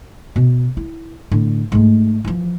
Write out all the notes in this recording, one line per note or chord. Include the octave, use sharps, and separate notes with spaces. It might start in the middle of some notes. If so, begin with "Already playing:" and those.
B2
E4
A2 D3
G#2 A3
E3 F3